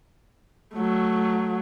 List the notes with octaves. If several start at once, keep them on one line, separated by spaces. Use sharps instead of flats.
F#3 A3